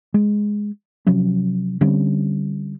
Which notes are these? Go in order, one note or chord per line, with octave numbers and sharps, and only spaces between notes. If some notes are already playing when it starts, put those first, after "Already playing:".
G#3
C3 F3 F#3 C#4
D3 G3 C4 C#4